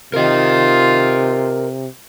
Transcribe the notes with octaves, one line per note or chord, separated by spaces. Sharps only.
C3 F4 A#4 D#5